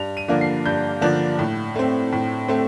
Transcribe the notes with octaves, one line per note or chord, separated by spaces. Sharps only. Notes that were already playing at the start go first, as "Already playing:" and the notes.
Already playing: G2 F7
D#7
D3 F3 A#3 D4
C7
G2 G6
D3 F3 A#3 D4
A2
A3 C4
A2
A3 C4